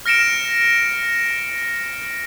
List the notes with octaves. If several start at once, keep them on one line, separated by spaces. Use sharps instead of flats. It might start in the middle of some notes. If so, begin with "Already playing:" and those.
F6 A#6 C#7 D7 E7